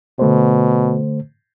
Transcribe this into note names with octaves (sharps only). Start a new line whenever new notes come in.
B2 D3 A3 C5